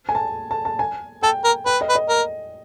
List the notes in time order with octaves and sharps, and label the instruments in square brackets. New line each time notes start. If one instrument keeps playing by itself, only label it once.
[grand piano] G#5
A5
A5
A5
G#5
[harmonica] A4 [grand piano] G5
[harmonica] A#4
[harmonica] B4 [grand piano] G5
[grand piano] D#5
[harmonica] B4
[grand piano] D#5
[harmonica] A#4